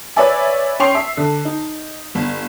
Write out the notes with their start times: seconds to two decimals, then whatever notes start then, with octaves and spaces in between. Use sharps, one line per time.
0.16 B4 C#5 D5 E5 G#5
0.80 C#4 G5 C6 C#6 C7 F7
0.95 E5
1.17 D3
1.45 D#4
2.15 G1